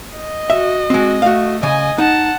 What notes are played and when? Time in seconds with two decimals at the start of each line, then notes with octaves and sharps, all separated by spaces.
0.17 D#5
0.50 F#4 E5
0.90 G#3 C4 F#4
1.22 A3 F#4 F5
1.63 C#3 D#5 G#5
1.98 D#4 F#5 A5